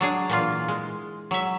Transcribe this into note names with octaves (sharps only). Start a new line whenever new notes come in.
F#3 D4 G#4
A#2 E3 F4
G#3
F#3 E5